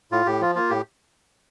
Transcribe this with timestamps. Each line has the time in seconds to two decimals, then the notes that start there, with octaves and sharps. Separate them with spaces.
0.12 A2 F4
0.26 A2 G4
0.41 F3 F4
0.55 A#3 F4
0.70 A2 G4